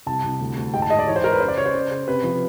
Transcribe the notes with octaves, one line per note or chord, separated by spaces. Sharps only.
C2 A5
C2
D2
D2
G#2 G5
A5
G#2 D#5
D5
E3 C#5
C5
G#3 A#4
B4
C#3 C5
D5
C#3 C#5
C5
C#3
C#3
C3 B4
F3